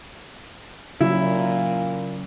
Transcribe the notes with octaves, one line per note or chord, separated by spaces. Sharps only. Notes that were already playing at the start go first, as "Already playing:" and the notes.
A#2 C#3 F#3 E4